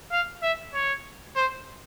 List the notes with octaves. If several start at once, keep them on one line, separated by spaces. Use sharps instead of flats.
F5
E5
C#5
C5